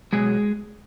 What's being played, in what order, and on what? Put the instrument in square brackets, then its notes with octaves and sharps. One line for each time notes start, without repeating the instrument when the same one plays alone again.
[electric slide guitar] B2 F#3 G#3 G#4